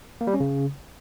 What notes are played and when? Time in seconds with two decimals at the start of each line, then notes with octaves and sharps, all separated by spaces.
0.21 A#3
0.27 G3
0.34 C#4
0.40 C#3